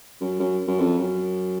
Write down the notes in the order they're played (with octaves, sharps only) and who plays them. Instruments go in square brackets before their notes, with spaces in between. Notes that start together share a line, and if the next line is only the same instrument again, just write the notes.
[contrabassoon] F#2
F#2
F#2
F2
F#2